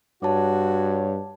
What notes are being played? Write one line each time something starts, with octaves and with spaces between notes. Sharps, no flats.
G2 F#4 C#5 F#5 A5 D6